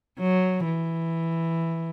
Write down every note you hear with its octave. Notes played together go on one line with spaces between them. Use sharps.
F#3
E3